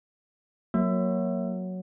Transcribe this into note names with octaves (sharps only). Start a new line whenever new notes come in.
F#3 A#3